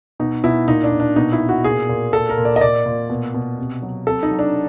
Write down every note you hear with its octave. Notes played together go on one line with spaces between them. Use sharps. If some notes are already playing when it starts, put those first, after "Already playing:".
B2 D#4
B2 E4
A#2 D#4
D4
A#2
D4
B2 D#4
E4
B2
F#4
A#2 G#4
A#2
A#2 A4
A#4
A#2
D5
D#5
A#2 D5
A#2
B2
B2
C3
F#3
C3 A4
D#4
F#3
D4